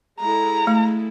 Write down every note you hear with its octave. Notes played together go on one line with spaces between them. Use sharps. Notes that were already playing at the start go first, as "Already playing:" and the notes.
G#3 E4 A4 A#5
A3